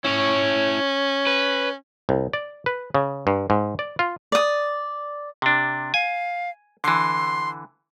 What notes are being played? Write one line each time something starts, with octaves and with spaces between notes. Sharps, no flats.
C#4 E4 C#5
B4
C2
D5
B4
C#3
G2
G#2
D5
F4
D5 D#6
C3 D4
F5 G#5
D3 E3 C6